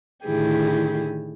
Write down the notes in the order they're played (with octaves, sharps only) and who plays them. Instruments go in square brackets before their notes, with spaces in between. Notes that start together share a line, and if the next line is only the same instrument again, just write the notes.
[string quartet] A2 D3 D#3 E4 G4 G#4